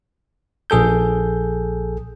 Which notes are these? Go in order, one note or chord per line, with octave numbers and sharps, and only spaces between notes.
A#1 G#4 A4 G6